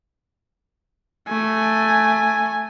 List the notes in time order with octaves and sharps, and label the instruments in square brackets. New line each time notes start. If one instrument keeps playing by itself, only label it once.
[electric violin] A3 G#5